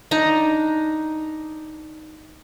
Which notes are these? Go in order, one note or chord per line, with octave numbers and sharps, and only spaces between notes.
D4 D#4 A#5